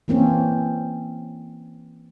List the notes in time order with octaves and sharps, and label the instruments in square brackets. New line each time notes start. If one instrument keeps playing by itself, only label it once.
[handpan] E3 A#3 C4 C#4